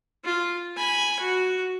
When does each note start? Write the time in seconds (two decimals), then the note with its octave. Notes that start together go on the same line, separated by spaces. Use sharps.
0.25 F4
0.76 G#5 B5
1.20 F#4